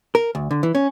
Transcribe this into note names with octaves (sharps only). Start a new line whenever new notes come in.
A#4
D2
D3
E3
C#4